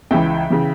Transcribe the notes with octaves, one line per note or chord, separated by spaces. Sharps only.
C#2 C#3 E3 E5 G5
C#3 E3